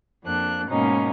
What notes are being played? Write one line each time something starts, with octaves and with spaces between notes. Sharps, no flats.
F2 A#3 D4 F#6
G#2 B2 A#3 C#4 D#4